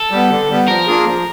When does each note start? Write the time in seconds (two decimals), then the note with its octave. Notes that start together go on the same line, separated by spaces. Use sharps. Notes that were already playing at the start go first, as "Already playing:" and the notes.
Already playing: A4
0.11 G3 B3
0.30 D3
0.49 G3 B3
0.68 F3 A#4
0.86 A#3 D4 F4 G#4
1.05 F3